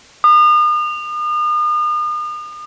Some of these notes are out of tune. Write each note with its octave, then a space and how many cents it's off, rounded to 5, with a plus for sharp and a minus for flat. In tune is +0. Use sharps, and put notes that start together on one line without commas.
D#6 -40